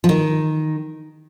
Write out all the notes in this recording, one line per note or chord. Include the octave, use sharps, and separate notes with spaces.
F3
D#3